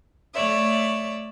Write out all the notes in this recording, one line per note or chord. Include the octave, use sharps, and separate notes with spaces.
A3 C#5 D5 E5